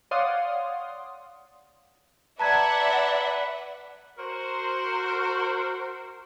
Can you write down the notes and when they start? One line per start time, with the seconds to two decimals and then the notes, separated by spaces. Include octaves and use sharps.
0.11 C#5 D5 F5 F#5 C6 D#6
2.39 B4 D5 E5 F#5 A5 A#5 G#6
4.19 F#4 A#4 C5